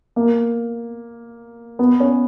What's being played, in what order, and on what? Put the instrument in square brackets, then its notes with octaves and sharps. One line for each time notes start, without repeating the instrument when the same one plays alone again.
[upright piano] A#3
B3
C#4